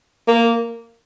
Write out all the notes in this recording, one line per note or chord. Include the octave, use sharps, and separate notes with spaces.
A#3